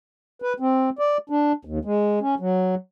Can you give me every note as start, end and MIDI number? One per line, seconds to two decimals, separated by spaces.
0.42 0.53 71
0.60 0.90 60
0.99 1.18 74
1.30 1.52 62
1.65 1.79 39
1.85 2.19 56
2.21 2.35 61
2.40 2.75 54